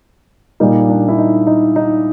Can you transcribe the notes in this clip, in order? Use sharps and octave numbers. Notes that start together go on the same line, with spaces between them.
A#2 G3 A#3 D#4
D4
E4
D#4
D#4
D#4